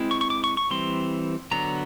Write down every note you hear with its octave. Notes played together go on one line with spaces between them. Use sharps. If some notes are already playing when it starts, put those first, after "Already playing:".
Already playing: G#3 C4 E4
C#6
C#6
D6
C#6
C#6
E3 G3 C4 C6
D3 F#3 B3 A#5